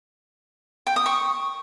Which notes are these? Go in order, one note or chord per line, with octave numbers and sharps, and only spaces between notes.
G5
D#6
C#6